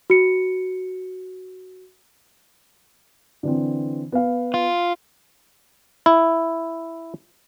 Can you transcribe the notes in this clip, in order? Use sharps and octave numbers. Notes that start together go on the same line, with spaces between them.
F#4 C#7
D3 E3 C4
B3 F5
F4
E4